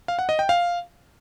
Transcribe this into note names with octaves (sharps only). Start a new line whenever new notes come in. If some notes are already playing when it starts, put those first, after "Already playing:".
F5
F#5
D#5
G5
F5